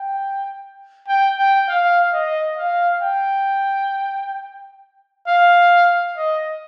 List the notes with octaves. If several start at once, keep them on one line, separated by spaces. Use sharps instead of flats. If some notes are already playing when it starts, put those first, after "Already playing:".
Already playing: G5
G5
G5
F5
D#5
F5
G5
F5
D#5